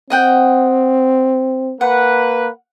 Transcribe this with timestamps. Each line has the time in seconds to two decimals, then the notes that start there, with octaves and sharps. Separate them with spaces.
0.10 C4 D#5 F#5 G5
1.81 A#3 B4 F#5